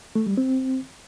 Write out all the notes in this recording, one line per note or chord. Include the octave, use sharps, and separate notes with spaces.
A3
G3
C4